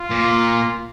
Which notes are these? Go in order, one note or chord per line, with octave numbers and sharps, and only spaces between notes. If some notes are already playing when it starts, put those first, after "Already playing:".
Already playing: F4
A#2